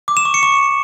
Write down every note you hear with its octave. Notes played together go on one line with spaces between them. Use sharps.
D6
E7
C#6
C#7
C#6